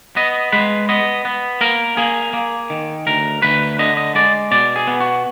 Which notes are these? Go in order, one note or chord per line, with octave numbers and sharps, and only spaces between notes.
B3 D#5
G#3 B4
B3 D#5
B3
A#3 A#4
A#3 G#4
A#3
D#3
D2 A#4
D2 B4
D3 D#5
D#5
G#3 D5
B2 D5
G#4
B3
F#4